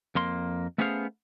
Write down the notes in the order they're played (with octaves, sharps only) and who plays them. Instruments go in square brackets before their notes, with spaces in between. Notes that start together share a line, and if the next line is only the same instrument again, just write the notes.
[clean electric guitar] F2 A#3 C6
A3 B3 C#4 G#4 C5 F5